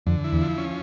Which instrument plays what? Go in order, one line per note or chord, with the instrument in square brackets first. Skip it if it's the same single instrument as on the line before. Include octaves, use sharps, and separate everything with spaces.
[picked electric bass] F2 [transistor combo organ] D3
[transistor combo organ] E4
[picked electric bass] E2
[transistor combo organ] F3
C#4